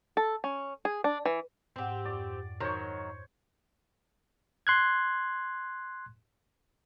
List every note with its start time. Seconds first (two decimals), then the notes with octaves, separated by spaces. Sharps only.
0.17 A4
0.44 C#4
0.85 G#4
1.04 D4
1.25 E3
1.76 G#2 C4 G4 F#5
2.05 F2 D5 G5
2.60 D#3 F#3 C5 C#5
4.67 C6 F#6 G#6